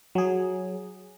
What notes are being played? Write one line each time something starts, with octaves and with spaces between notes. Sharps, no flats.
F#3 G#4